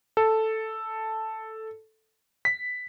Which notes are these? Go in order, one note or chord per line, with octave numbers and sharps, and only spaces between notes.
A4
B6